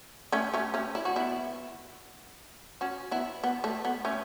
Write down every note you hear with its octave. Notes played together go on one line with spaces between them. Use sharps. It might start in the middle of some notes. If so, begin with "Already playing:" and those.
A3 C#4
A3 C#4
A3 C#4
E4
F#4
B3 E4
C#4 F#4
B3 E4
B3
A3
B3
A3 C#4